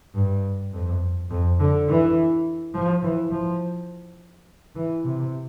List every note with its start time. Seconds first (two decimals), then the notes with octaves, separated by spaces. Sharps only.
0.14 G2
0.73 F2
1.30 F2
1.59 D3
1.88 E3
2.74 F3
3.03 E3
3.31 F3
4.75 E3
5.05 C3